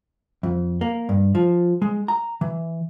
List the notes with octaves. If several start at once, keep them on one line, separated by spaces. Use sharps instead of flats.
F2
A#3
G2
F3
G#3
A#5
E3